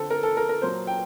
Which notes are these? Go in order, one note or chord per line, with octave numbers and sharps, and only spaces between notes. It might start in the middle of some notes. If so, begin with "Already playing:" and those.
Already playing: D3 C4 A4
A#4
A4
A#4
A#4
A#2 F#3 A#3 C5
G5